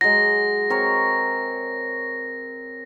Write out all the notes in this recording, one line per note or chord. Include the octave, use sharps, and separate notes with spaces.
F#3 G#3 A#6
C4 A#4 C#5